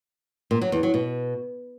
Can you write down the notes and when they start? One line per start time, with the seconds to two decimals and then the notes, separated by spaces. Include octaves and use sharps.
0.51 A#2
0.62 F#3
0.72 E2
0.83 F#3
0.94 B2